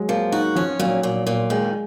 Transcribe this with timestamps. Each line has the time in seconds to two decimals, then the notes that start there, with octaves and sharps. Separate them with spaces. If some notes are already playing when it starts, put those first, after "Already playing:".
Already playing: F#3 G#3
0.09 F3 A#3
0.32 D#4 F#4
0.56 F3 C#4
0.79 A#2 F#3
1.03 A#2
1.27 A#2
1.50 D#3 G#3